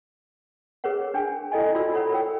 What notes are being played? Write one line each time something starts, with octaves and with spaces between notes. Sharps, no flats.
G#4 A#4 B4 C#5 F#5
D4 G5 G#5
E4 A4 D5 D#5 G5 G#5
F4 F#4 C5 D5 E6
E4 A4 C#5 F#5 B5
A#4 G5 E6